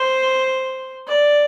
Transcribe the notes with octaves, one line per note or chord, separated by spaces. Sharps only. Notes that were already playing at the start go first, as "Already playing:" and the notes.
Already playing: C5
D5